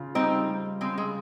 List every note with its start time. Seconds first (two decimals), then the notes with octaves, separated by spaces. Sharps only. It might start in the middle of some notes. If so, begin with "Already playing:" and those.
Already playing: C#3 F4
0.15 G3 C4 D#4
0.49 G3
0.81 C#3 G#3 C4
0.98 G#3